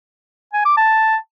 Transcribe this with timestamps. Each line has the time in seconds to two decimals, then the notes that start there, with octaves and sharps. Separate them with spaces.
0.53 G#5
0.65 D6
0.77 A5